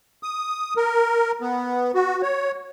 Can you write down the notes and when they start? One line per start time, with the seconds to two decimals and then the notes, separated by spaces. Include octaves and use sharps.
0.23 D#6
0.77 A#4
1.41 B3
1.94 F#4
2.23 C#5